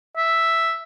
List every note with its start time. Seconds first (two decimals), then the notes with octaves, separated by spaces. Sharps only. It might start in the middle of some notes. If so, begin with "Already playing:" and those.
0.17 E5